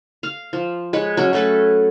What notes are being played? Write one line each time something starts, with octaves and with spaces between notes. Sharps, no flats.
F5
F3
G#3 B4 C#5
F#3 C#4
F#3 A3 A4 B4